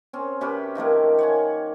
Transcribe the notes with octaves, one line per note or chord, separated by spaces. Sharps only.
C4 C#4
C3 C#4 G4 B4
D#3 F3 A3 A#3
C#5 F#5 G#5